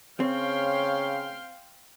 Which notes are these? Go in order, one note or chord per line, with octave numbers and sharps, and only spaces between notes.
C#3 C4 C#5 F5 G5 C6